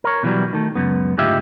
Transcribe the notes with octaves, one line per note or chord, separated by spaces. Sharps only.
A#4 C#5
B2 E3 F#3 G3
D#3 A3
C#2 F#2 B3
D2 G#2 G#3 F4 G4 E5